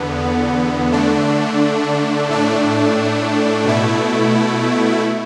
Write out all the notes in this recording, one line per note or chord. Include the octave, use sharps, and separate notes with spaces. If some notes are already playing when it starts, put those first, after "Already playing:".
Already playing: E2 D3 B3
D3 A3 D4
A2 A3 D4
B2 A3 E4